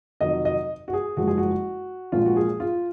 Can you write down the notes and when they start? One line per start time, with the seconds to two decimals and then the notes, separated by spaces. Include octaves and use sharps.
0.21 F2 C3 D#3 F#3 D#5
0.45 D#5
0.88 F#4
0.93 G#4
1.17 F#1 F#2 F3 G#3 F#4
1.27 G#4
1.38 F#4
2.12 A#1 A#2 F3 G#3 F4
2.26 F#4
2.36 G#4
2.60 F4